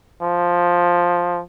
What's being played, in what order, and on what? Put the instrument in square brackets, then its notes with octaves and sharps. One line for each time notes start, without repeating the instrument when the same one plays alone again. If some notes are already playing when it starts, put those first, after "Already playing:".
[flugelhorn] F3